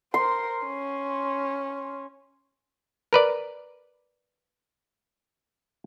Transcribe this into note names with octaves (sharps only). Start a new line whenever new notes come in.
A#4 C5 C6
C#4
A#4 B4 D5